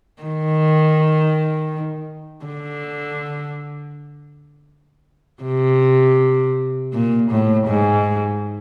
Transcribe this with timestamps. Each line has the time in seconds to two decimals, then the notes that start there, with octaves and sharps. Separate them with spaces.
0.22 D#3
2.45 D3
5.43 C3
6.93 A#2
7.31 A2
7.67 G#2